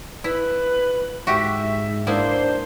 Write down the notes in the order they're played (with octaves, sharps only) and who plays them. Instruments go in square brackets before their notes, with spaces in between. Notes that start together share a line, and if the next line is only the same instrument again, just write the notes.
[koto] E4 [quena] B4
[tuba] G#2 [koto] F#4 G4 [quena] E5
[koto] A#3 B3 E4 [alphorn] D4 [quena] C5